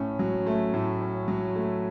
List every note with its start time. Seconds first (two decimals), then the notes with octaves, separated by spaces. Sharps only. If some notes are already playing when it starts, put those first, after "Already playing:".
Already playing: A2 C#4
0.19 F#3
0.46 A3
0.74 A2
1.01 C#4
1.28 F#3
1.55 A3